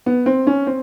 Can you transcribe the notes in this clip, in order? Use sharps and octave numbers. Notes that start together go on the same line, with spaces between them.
B3
C4
C#4
C4